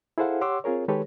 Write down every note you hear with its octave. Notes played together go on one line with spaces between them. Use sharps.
E4 G#4 A4 C5 F5 F#5
G4 C#5 F#5 C6 D6 E6
C4 F4 G#4 A#4 C#5
D#3 G#3 G4 A4 B4 C#5